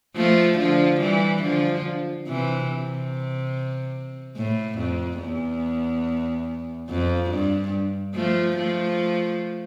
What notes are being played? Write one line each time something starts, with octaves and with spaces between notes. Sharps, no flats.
F3 A3
D3 F3
E3 G3
D3 F3
C3 E3
C3
A2
F2
E2
F2
G2
F3 A3
F3 A3